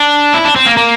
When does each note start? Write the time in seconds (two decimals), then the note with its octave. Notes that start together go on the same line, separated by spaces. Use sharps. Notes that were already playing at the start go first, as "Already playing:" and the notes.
Already playing: D4
0.34 E4
0.45 D4
0.56 C4
0.66 A#3
0.77 A#3